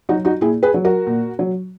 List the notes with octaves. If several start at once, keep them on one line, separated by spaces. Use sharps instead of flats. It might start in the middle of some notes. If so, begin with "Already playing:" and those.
F#3 D#4 F#4
D#4 F#4
A#2 E4 G#4
G#4 B4
F#3
F#4 A#4
A#2
F#3